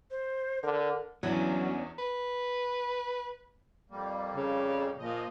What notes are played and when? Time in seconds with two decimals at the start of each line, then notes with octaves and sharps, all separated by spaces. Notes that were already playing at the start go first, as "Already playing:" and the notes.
0.11 C5
0.63 D3 A#4
1.23 E2 F#3 B3 C#4 D4 E4
1.99 B4
3.91 F2 G3 A#3
4.36 C#3
4.99 A#2 F3 D#5